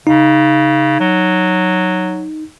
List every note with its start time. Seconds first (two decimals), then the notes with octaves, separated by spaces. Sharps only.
0.07 C#3 D#4
1.00 F#3